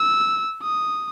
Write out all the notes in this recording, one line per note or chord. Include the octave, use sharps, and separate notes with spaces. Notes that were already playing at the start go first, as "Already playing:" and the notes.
Already playing: E6
D#6